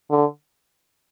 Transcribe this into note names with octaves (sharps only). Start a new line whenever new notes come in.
D3